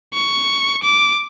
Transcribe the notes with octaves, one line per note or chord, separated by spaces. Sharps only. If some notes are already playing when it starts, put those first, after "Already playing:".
C#6
D6